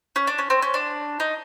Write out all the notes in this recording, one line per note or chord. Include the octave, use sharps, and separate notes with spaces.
C#4
D4
C#4
C4
C#4
D4
D#4